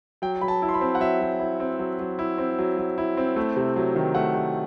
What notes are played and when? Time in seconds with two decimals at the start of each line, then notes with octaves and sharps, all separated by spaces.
0.22 F#3 G5
0.41 F#3 B5
0.48 A5
0.62 E4
0.69 C6
0.74 B5
0.81 C4
0.95 F#5
1.00 F#3 E5
1.21 F#3
1.40 E4
1.60 C4
1.79 F#3
1.99 F#3
2.19 E4
2.38 C4
2.59 F#3
2.78 F#3
2.98 E4
3.17 C4
3.36 A3
3.56 C3
3.76 F#3
3.96 D#3
4.15 A3 F#5
4.35 C3